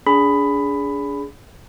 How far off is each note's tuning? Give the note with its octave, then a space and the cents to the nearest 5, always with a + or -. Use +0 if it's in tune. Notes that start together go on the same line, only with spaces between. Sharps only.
D4 -35 G#4 +0 B5 +10